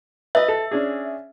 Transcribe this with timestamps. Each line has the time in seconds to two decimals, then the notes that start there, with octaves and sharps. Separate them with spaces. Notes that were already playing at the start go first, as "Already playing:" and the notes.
0.35 B4 D#5 E5
0.48 A4
0.71 C#4 D4 G#4